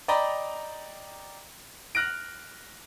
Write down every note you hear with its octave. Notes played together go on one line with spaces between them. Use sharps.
D5 D#5 G5 A#5 B5
F6 F#6 A#6 D7